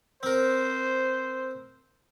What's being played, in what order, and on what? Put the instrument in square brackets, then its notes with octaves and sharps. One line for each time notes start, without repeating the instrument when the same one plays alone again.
[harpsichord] C4 A#4 [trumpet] C5